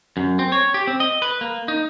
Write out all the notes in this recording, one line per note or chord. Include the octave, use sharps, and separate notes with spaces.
F#2
C4
C#5
G4
C4
D#5
B4
A#3
D#4